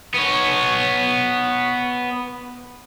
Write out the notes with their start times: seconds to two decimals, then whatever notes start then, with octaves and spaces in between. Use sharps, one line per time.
0.14 B3 C#5